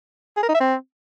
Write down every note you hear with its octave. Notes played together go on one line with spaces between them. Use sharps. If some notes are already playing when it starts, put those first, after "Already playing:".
G#4
A#4
D#4
E5
C4